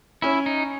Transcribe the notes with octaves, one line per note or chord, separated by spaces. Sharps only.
C#4 E4
D#4